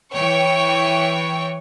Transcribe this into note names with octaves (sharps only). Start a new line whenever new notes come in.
E3 C#5 G5 C#6